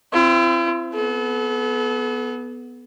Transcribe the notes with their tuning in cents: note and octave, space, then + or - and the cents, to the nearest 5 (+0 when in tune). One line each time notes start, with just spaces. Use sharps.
C4 +0 E4 +45
B3 +0 A4 -40